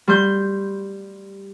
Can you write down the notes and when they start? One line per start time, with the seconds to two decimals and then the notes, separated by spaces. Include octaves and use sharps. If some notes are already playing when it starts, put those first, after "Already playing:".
0.08 G3 C6 G6